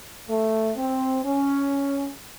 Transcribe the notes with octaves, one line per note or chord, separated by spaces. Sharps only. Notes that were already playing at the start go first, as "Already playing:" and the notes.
A3
C4
C#4